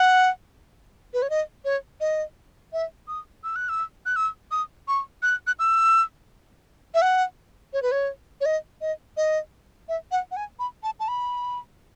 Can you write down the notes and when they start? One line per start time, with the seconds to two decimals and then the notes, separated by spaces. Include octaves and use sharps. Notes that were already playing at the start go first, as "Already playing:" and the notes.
Already playing: F#5
1.13 B4
1.22 C#5
1.30 D#5
1.65 C#5
2.00 D#5
2.73 E5
3.08 D#6
3.44 E6
3.56 F#6
3.69 E6
4.06 F#6
4.16 E6
4.51 D#6
4.88 C#6
5.22 F#6
5.47 F#6
5.59 E6
6.94 E5
7.02 F#5
7.73 C#5
7.82 B4
7.92 C#5
8.41 C#5
8.45 D#5
8.81 D#5
9.17 D#5
9.88 E5
10.11 F#5
10.31 F#5
10.36 G#5
10.59 B5
10.83 A5
11.00 A5
11.08 B5